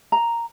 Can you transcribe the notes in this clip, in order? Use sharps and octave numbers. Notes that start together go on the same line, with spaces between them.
A#5